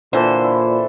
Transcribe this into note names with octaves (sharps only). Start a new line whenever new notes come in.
A#2 D3 E3 A4 C5
E4